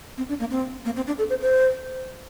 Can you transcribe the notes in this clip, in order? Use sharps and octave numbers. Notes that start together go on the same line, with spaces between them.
C4
D4
A#3
C4
A#3
C4
D4
A4
C5
C5